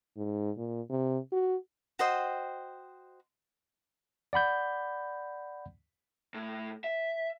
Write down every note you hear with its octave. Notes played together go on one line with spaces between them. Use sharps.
G#2
A#2
C3
F#4
F#4 C5 D#5 G5
D5 F#5 B5 G6
A2
E5